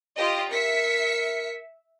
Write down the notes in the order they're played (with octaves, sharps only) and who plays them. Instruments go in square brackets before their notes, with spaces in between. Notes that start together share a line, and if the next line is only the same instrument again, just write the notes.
[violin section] F4 G4 D#5
[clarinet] A#4 [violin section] E5 B6 C#7